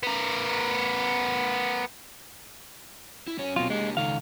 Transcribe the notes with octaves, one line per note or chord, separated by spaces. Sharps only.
B3 A#4
E4
F#3 C#4 C#5
B2 F#3 C4 F4
G#3 A#3 D4 G4
C#2 D#3 D#4 A4 F5